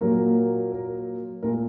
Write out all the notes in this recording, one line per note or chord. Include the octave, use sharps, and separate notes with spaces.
A#2 F#3 A#3 A#4
A#4
A#2 A3 A#4